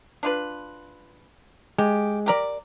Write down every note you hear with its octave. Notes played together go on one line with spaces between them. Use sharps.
D4 F4 B4
G#3 G4
G4 A#4 D5